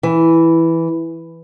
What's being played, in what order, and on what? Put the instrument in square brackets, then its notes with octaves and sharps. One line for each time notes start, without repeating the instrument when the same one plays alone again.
[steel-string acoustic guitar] E3